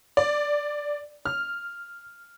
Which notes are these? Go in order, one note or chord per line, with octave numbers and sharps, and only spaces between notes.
D5
F6